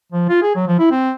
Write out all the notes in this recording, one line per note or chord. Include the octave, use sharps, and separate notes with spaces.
F3
F4
G#4
F#3
F3
E4
C4